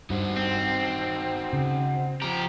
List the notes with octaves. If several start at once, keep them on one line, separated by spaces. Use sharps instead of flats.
G2 D#4 F#4 C5
C4
C#3
F3 G4 A#5